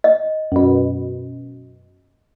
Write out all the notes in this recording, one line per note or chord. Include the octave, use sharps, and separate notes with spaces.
D#5
F#2 B2